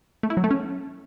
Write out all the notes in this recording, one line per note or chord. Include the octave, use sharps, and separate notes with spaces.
A3
E4
F#3
A3
C#4